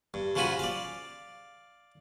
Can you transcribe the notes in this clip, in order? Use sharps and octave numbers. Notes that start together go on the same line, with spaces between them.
G2
C#3 F3 F4 F#4 G#5 B5
D5 F5